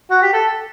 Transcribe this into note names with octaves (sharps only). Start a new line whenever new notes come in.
F#4
G4
A4